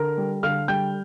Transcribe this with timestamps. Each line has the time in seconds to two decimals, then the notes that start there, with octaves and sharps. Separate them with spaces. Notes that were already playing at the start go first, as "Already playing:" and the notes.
Already playing: D3 A#4 A#5
0.18 G3
0.43 D3 F5 F6
0.68 G3 G5 G6